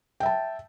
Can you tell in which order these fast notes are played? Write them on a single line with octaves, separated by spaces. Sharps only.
G5 E5 A5